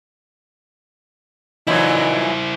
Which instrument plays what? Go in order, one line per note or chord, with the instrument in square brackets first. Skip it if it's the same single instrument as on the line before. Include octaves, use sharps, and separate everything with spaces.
[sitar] A#2 E3 F#3 [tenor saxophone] D#4 [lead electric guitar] E4 C5